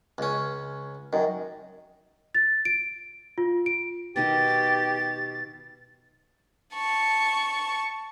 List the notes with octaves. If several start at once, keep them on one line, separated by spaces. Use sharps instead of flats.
C#2 C#4
F#2 D#3
A6
D7
F4
D7
B2 D#3 G4 D#5 A6
A5 C#6